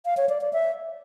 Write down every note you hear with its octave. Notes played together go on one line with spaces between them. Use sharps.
F5
C#5
D5
D5
E5